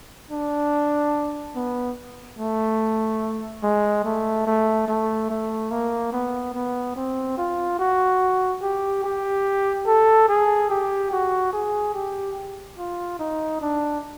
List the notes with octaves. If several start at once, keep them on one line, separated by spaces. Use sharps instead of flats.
D4
B3
A3
G#3
A3
A3
A3
A3
A#3
B3
B3
C4
F4
F#4
G4
G4
A4
G#4
G4
F#4
G#4
G4
F4
D#4
D4